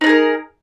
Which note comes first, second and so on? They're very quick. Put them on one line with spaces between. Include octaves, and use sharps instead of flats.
D#4 D4 G#4 A#4